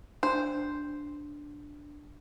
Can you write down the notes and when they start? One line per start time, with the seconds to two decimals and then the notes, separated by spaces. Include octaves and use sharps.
0.23 D4 C5